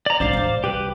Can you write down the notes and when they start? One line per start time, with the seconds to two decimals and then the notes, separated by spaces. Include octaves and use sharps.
0.06 D5 A#5
0.20 G#1 D4 C5 D5 F5
0.33 A1 E2
0.64 C2 G4 B4